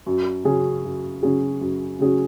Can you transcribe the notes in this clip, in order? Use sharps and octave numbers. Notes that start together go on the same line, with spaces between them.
F#2
C#3 F#3 C#4 G#4
F#2
C#3 F#3 C#4 G#4
F#2
C#3 F#3 C#4 G#4